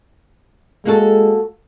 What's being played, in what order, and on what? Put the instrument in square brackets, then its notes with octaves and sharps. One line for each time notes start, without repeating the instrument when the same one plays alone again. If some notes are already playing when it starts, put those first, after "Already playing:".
[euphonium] G#3 [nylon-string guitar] A#3 F#4 A4